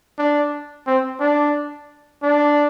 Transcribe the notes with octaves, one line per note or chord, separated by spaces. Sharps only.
D4
C4
D4
D4